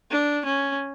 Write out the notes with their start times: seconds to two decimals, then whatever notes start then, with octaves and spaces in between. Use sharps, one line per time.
0.11 D4
0.45 C#4